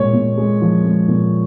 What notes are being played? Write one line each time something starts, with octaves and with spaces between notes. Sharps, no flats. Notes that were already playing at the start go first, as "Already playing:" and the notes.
Already playing: A#2 G#3 C#5
A#2
G#3
F3
G#3
A#2